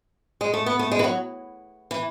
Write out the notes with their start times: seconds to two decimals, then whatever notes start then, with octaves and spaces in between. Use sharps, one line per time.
0.41 G#3
0.54 A3
0.66 B3
0.79 A3
0.92 G#3
0.99 E3
1.04 F#3
1.91 E3